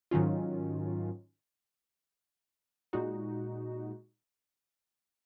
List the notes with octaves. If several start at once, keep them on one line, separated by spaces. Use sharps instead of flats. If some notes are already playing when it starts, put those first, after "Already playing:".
G#2 D#3 F#3 C#4 F4
A#2 G#3 D#4 F#4